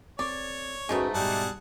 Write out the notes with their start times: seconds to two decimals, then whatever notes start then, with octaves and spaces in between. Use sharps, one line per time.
0.19 C4 A4 C#5 D5
0.89 G#2 G#3 A3 C#4 D#4 F#4 B4
1.14 G#2 B2 G3 G#4 F#5 A5